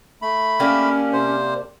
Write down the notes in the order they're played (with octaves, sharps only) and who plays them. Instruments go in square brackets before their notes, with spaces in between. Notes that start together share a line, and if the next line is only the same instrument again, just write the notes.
[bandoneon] A3 B5
[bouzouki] A#3 D4 G4 [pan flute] C#4
[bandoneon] C3 C5